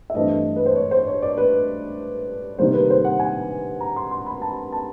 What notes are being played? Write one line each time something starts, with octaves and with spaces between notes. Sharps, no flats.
E5
G2 E3 A3 C4 D#5
B4
C5
C#5
C5
C#5
D5
B4
C3 D#3 G3 A#3 C5
B4
C5
F#5
G#5
A#5
C6
C6
B5
A5
A5